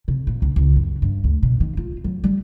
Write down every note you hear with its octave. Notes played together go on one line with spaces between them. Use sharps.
C3
A#2
C#2
C#2
F#2
G2
D2
B2
D#3
F4
F#3
G3